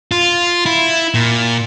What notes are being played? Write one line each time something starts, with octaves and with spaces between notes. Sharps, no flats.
F4
E4
A#2